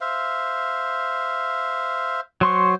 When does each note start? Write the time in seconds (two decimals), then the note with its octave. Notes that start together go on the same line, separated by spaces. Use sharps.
0.01 C5 E5 F5
2.41 F#3 C5 C6 C#6